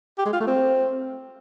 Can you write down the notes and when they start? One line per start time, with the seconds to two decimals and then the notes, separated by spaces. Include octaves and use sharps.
0.18 G4
0.26 G#3
0.33 F4
0.40 A3
0.48 C4